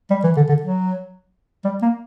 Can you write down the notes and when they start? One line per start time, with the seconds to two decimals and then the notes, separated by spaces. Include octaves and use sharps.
0.10 G3
0.24 E3
0.37 D3
0.49 D3
0.62 F#3
1.65 G3
1.82 A#3